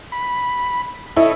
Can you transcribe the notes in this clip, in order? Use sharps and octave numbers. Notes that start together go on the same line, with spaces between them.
B5
E4 A4 C#5 D#5